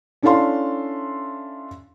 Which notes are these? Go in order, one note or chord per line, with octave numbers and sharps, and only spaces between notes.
C#4 D4 E4 A4 F5 C6